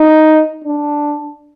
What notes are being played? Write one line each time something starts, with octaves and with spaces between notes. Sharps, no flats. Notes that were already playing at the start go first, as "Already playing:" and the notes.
Already playing: D#4
D4